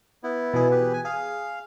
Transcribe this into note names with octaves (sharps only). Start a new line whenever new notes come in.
B3 E4
B2 E3 G#4
G4 B4
G#5
G#4 F5